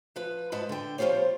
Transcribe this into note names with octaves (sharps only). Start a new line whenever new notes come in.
F3 B4
G#2 B4 D#5 A5
D3 G5
F3 G3 B3 F4 C5 C#5